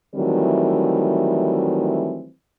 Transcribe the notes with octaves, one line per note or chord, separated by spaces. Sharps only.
D#3 E3 F#3 G3 A3 C4